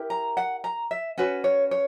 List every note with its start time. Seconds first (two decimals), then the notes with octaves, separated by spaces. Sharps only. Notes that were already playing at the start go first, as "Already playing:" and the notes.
Already playing: E4 G4 A#4
0.10 A#5
0.37 F#5
0.64 A#5
0.91 E5
1.18 C#4 F#4 B4
1.44 C#5
1.71 C#5